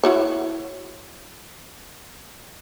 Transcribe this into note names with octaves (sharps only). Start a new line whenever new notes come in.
E4 F#4 C#5